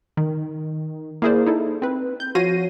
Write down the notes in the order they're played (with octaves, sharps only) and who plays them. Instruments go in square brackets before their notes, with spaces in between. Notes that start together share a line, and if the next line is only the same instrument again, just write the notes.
[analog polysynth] D#3
A#3 E4 G#4 A#4 C5 D5
D#4 E4 A4
C4 B4
G6
F3 F#4 C#5 A#6 C7 D#7